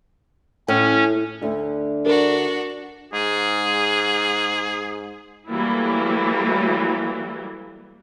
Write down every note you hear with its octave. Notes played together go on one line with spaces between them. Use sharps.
A2 C#4
D2 D3
D4 F#4 A#4
G#2 G#4
E3 F#3 G3 A3 A#3 E4